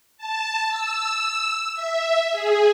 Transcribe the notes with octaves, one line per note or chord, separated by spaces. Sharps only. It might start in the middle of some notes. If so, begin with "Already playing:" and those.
A5
E6
E5
G#4